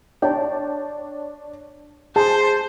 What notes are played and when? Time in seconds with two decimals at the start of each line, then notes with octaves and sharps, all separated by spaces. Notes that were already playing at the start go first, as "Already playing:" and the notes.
0.22 D4 C#5 G5 A5
2.16 G#4 C5 A5